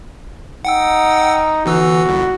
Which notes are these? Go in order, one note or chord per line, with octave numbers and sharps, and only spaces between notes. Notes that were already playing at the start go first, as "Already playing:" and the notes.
D#4 F#5 G5 E6
G1 E3 F#4 E6
G1 C2